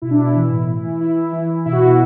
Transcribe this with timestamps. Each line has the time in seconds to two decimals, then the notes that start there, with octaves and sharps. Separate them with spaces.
0.02 B2 E4
0.11 D4
0.18 B2 E4
0.35 E3
0.51 A2
0.68 E3
0.83 E3
1.00 E3 E4
1.17 E3
1.32 E3
1.50 E3
1.65 B2 E4
1.72 F#4
1.80 B2 E4